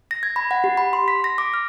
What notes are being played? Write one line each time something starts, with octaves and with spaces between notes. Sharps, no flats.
A#6
G#6
B5
F#5
G4
B5
C6
B6
A#6
D6
F6